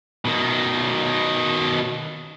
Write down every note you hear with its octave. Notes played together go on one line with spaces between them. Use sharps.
B2 D#3